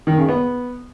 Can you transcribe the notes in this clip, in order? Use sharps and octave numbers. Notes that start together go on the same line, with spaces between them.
D#3
C#3
B3